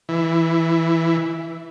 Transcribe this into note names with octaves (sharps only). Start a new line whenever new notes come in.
E3